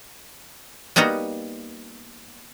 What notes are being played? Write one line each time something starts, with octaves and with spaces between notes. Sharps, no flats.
G3 A#3 B3 D#4 F#4 D#5